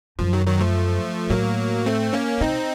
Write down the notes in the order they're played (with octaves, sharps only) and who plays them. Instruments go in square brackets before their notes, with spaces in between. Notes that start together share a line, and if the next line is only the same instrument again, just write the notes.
[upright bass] F#2 [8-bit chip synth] F3
[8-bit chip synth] D#3 F#3
D#3 F#3
F3 A3
[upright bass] A2 [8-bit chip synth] F#3 A#3
[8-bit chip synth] A3 C4
A#3 C#4
[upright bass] C3 [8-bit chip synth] C4 D#4